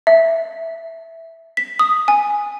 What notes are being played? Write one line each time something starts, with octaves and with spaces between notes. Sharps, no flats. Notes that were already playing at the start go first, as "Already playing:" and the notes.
E5
B6
D#6
G#5